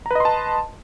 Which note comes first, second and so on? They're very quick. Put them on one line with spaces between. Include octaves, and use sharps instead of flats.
A#5 B4 D#5 C6 A5